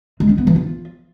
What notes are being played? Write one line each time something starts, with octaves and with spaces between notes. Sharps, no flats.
G#3
C#4
B3
E3
F4